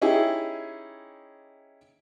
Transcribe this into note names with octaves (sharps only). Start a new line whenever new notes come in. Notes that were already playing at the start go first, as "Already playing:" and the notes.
C#4 D#4 E4 G4 G#4